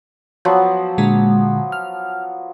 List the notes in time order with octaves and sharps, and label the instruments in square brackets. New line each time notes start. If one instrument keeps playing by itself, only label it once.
[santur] F3 F#3 B3
[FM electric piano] A#2 D3 G#3
F6